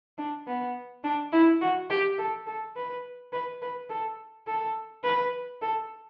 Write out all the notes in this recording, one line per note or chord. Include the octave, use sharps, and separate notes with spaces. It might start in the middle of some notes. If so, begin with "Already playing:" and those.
D4
B3
D4
E4
F#4
G4
A4
A4
B4
B4
B4
A4
A4
B4
A4